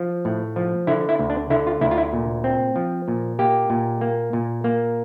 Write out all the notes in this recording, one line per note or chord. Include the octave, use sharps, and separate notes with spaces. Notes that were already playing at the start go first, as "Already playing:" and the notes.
Already playing: F3
A2
F3
D3 E4
E4
D2
D4
D3 E4
F4
D2 E4
F4
E4
A#2
C4
F3
A#2
A#3 G4
A#2
A#3
A#2
A#3